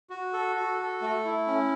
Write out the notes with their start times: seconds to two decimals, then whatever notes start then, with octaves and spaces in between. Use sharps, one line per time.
0.10 F#4
0.33 A4
0.56 F#4
0.78 A4
1.02 A3
1.25 E4
1.47 C#4